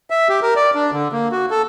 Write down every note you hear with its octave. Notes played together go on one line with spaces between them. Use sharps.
E5
G4
A#4
D5
D4
D3
A#3
F#4
A4